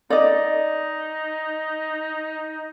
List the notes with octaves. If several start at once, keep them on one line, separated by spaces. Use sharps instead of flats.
D#4 D5 D#5